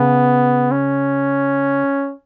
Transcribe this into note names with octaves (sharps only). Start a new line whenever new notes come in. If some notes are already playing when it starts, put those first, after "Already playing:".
Already playing: C#3 B3
C#4